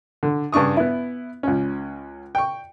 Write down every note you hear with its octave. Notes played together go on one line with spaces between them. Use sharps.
D3
G2 C#3 D4 C#6 D#6
B3 E4
C#2 C#4
G5 C#6